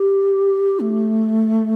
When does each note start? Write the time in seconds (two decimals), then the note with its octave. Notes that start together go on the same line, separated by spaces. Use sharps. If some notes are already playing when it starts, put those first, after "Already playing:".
Already playing: G4
0.80 A3